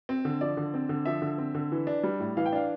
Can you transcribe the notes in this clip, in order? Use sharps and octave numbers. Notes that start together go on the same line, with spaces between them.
C4
D3
F3 D5
D3
C4
D3
F3 E5
D3
C4
D3
E3
D4
G3
A2
E3 F5
G5
D4 F5